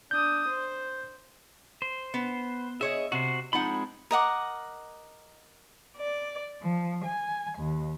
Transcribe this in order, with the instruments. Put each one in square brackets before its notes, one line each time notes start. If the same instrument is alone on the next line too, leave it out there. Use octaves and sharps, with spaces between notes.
[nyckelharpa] D4 D#6 [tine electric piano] G6
[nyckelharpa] C5
[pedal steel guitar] C5
[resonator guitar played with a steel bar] B3
[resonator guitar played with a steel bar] G#4 C#5 D#5 [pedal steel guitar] E5
[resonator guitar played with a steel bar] C3 [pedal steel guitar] F#4 C5
[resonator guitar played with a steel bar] F3 D#4 F#5 [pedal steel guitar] G#3 C4 B5
[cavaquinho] A#4 D#5 F#5 D6
[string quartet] D5
F3
G#5
D#2